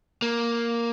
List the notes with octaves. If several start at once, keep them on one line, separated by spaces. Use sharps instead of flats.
A#3